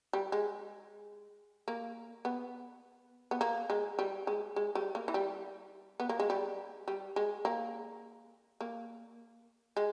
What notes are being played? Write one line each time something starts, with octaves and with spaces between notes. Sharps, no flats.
G3
G#3
A#3
B3
B3
A#3
G#3
G3
G#3
G#3
G3
A#3
E3
G3
B3
A#3
G#3
G3
G3
G#3
A#3
A#3
G#3